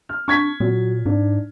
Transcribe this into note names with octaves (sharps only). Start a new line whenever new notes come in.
F6
D4 C#6 G#6 B6
A#2 F#3
G#2 D4